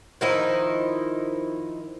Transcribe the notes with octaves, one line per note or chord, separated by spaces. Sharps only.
D#3 F3 D#4 E4